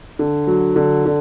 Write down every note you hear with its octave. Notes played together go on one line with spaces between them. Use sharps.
D3
F#3
D3
D3